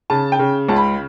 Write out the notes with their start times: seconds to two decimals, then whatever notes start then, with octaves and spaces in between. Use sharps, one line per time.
0.10 C#3 A5
0.32 G5
0.39 C#3
0.69 C#2 A5
0.76 B5